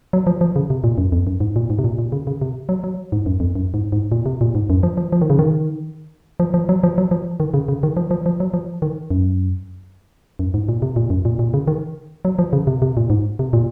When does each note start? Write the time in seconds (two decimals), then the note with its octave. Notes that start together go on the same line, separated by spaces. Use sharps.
0.13 F#3
0.27 F3
0.41 F3
0.56 C#3
0.70 C3
0.84 A#2
0.98 F#2
1.12 F2
1.27 F#2
1.40 G#2
1.56 A#2
1.70 G#2
1.79 C3
1.84 A#2
1.99 A#2
2.12 C#3
2.27 C#3
2.41 C3
2.69 F#3
2.84 F#3
3.12 G#2
3.26 F#2
3.40 F2
3.55 F#2
3.74 G#2
3.92 G#2
4.12 A#2
4.26 C3
4.41 A#2
4.55 G#2
4.70 F#2
4.83 F3
4.97 F3
5.12 F3
5.21 D#3
5.30 C#3
5.39 D#3
6.40 F3
6.54 F3
6.69 F#3
6.83 F3
6.98 F#3
7.11 F3
7.40 D#3
7.54 C#3
7.68 C#3
7.83 D#3
7.97 F3
8.11 F3
8.26 F3
8.40 F#3
8.54 F3
8.82 D#3
9.11 F#2
10.39 F#2
10.54 G#2
10.69 A#2
10.82 C3
10.96 A#2
11.10 F#2
11.25 A#2
11.39 A#2
11.54 C#3
11.68 D#3
12.25 F#3
12.39 F3
12.53 C#3
12.67 C3
12.82 C3
12.97 A#2
13.10 G#2
13.39 C3
13.53 A#2